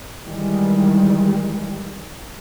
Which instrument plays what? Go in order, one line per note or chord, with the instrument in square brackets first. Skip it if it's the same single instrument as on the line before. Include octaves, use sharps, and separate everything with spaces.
[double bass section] D#3 E3 G3 G#3